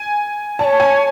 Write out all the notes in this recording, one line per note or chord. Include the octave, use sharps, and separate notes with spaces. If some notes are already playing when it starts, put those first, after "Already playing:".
Already playing: G#5
D5 A5
C#5
G#5